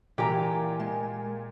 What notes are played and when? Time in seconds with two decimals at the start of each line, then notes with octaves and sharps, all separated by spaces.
0.18 A#2 E3 G4 G#5 A#5
0.80 G#3